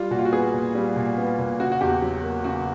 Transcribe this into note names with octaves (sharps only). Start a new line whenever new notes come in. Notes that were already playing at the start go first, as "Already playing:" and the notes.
Already playing: G3 F4
A#2 F#4
F4
F#4
B3 G#4
A#2
G3
A#2
B3
A#2
C#3 F#4
F#4
E2 G4
F#3
A#3
C#3 F#4